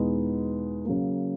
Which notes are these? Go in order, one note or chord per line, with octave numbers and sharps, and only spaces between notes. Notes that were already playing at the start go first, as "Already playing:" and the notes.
Already playing: E2 B2 G#3 B3 D#4
C#3 F#3 A#3